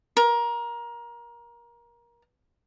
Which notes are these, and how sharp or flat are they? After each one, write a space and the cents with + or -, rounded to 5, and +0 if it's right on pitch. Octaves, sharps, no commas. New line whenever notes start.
A#4 +20